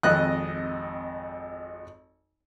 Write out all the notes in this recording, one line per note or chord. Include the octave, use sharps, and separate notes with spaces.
G#1 F2 D#5 F#6